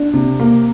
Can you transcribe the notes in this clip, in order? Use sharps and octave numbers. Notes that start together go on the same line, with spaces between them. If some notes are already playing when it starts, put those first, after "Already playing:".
Already playing: D4
C3
A#3